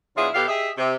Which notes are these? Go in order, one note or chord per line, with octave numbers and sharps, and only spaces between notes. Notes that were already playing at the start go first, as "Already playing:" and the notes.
B2 F#3 D4 E4 F4 G#4
B2 G4 A4 F5
G4 G#4 D#5 E5
C3